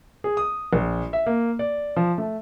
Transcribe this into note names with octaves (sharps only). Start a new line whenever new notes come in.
G#4
D#6
A#1
E5
A#3
D5
F3
A3